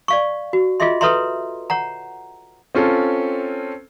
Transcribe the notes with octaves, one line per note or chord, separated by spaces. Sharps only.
D5 F5 C#6
F#4
F4 G#4 D#5 E5 C6
A4 B4 C#5 E5 A#5 C6
C#5 F#5 A#5
C4 C#4 F4 A4